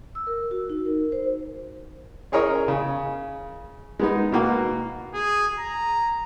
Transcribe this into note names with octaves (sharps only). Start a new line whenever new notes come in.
E6
A#4
F#4
D#4
A#4
C5
C#4 G#4 A#4 C#5 D#5
C#3
G#3 B3 D#4
B2 A#3 F#4
G#4
A#5